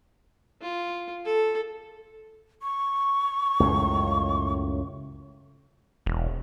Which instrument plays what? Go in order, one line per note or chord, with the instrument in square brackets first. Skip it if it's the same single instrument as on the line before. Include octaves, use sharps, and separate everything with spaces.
[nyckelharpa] F4
A4
[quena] C#6
[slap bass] C#2 F#2 A2
[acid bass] E1